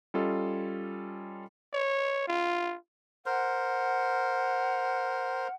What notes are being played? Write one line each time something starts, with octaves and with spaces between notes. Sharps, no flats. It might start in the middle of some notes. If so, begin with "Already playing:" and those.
G3 C#4 F4 A4 D#5
C#5
F4
A#4 C5 F#5